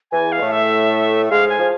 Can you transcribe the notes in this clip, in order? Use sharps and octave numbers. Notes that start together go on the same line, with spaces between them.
E2 E3 G#5
G#3 F5
A2 A3
E5
G#2 G#3 F5
G#5
F3